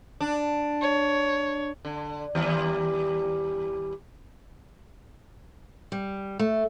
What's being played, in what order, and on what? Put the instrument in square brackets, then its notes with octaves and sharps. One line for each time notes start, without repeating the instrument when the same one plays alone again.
[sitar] D4
[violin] C#5
[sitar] D3
D#2 E3 G3
[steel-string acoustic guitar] G3
A3